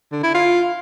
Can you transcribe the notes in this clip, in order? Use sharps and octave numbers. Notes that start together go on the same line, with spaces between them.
D3
E4
F4